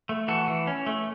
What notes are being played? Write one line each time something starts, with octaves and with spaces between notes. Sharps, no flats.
A3
E3 F#4 A4
E3
C#4
A3